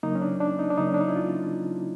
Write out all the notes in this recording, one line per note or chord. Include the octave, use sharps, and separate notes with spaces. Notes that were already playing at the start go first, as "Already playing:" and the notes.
C#3 F#3 A#3 D#4
C#4
D4
D4
D#4
D4
C#3 F#3 A#3 D#4
C#4
D4
D#4
E4
F4